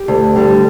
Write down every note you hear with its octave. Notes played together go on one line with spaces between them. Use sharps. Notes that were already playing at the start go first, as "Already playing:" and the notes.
Already playing: G4
D2
D3 G3